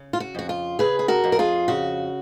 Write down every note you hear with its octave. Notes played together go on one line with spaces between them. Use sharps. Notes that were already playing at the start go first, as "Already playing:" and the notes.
Already playing: C#3
F4
F#4
F2 F#4
F4
C#3 G#4 B4
G#4
F#4 A#4
F2
A#4
F4 G#4
C#3 F#4